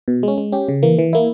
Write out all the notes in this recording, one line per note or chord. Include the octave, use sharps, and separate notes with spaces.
B2
G#3 C#4
G#3
C#4 G4
C#3
E3 A#3
E3
A#3 E4